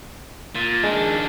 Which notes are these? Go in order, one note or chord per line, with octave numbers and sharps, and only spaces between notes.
A#2
D#3 G#3 D4